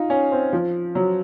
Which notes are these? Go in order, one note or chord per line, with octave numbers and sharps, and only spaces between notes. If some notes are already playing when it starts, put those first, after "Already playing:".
Already playing: D#4 F4
C#4
C4
F3
F#3